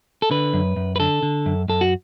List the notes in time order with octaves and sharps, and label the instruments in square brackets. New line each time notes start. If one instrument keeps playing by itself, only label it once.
[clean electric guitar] A4
D3 B4
F#2
F#2
B4
D3 A4
D3
F#2
F#2 A4
F#4